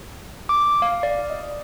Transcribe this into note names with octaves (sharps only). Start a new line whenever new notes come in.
D6
F5
D5
D#5